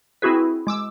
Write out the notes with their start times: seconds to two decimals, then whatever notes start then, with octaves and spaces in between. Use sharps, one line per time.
0.22 C4 E4 F#4 G#4 B4
0.67 G#3 D6 E6